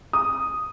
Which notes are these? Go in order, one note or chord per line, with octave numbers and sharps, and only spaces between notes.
D#6